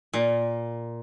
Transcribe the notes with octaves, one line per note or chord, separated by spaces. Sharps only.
A#2